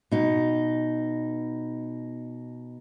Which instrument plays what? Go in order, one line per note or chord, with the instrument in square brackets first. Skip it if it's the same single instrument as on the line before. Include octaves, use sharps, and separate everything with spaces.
[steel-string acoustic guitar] B2 D#4